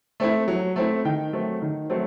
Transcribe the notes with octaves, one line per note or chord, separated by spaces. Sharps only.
A3 C4 E4
F#3
A3 C4 E4
D#3 G5
F#3 A3 C4
D#3
F#3 A3 C4